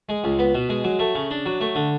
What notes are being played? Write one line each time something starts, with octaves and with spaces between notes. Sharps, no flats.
G#3
C#2
B3
B2
G#3
F#3
A3
C#3
D4
F#3
A3
D3